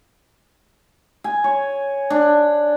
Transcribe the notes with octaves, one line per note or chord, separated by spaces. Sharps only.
G#5
C#5
D4